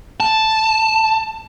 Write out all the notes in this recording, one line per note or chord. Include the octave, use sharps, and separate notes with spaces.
A5